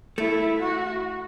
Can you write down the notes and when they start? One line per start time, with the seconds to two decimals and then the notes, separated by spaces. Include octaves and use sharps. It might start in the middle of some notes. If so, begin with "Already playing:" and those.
0.18 A3 E4
0.60 F#4